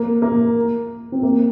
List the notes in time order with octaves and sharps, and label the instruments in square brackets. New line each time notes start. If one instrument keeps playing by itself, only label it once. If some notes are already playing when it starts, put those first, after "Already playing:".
Already playing: [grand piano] A#3
A#3
C4
A#3